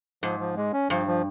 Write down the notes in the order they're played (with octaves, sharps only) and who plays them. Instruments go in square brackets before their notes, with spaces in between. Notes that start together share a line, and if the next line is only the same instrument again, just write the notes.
[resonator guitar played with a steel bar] G#2 [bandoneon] F3
[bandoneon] F3
G#3
C#4
[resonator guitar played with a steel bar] G2 [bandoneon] F3
[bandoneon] F3